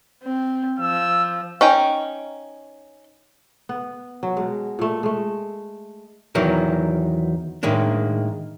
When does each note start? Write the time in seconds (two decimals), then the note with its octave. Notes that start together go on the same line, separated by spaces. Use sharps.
0.23 C4
0.80 F3 E6
1.61 C#4 D#4 G5
3.69 B3
4.23 F#3
4.37 B2 G#3
4.79 A#2 A3
5.03 G#3 A3
6.35 E2 D#3 E3 F#3 A#4
7.63 A2 D#3 G#3 A#3 D4